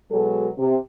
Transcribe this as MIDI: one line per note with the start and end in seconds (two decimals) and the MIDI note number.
0.11 0.49 47
0.11 0.49 54
0.11 0.49 56
0.11 0.49 69
0.58 0.76 48